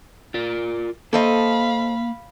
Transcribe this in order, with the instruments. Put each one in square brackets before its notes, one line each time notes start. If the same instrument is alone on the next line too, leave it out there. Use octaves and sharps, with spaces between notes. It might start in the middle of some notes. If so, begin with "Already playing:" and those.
[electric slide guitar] F4 A#4 D5
[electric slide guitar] A#3 [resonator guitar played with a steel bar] A4 C5 D#5 [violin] F5 B5